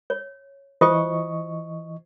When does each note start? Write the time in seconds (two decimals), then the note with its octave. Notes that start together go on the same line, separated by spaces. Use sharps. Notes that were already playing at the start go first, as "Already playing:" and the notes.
0.10 C#5
0.81 E3 F4 C5 D#5 C#6 D#6